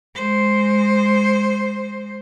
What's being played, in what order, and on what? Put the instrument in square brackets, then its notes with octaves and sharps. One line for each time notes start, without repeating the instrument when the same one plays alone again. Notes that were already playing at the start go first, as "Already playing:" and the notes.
[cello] G#3 C5